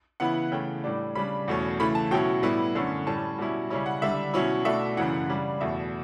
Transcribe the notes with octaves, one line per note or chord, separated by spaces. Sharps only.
C#3 E3 B3 E4 F#5
C#3 E3 A3 G5
A2 G3 D4
C#3 G3 D4 B5
E2 B2 A3 C#4
C#3 E3 A3 B5
A5
B2 F#3 C#4 E4 G5
A2 G3 B3 E4
F#2 D3 A3 C#4
A2 G3 C#4 A5
B2 G3 C#4 E4
C#3 G3 C#4 E4
F#5
D3 G3 D4 E5
B2 F#3 C#4 E4
B2 A3 D4 E5
F#2 C#3 E3 F#5
C#3 G3 D4
E2 B2 A3 E5